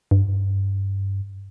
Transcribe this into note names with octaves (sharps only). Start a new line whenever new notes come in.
G2